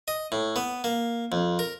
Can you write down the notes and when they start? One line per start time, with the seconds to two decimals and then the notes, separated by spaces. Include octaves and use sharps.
0.08 D#5
0.32 A2
0.56 B3
0.84 A#3
1.32 F2
1.59 A#4